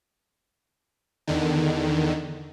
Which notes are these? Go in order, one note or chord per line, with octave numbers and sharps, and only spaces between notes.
E2 D3 D#3